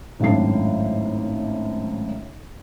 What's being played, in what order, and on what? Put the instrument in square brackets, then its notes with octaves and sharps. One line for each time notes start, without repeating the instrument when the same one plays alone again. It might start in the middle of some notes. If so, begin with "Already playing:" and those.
[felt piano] G#1 F#2 A2 D4 C7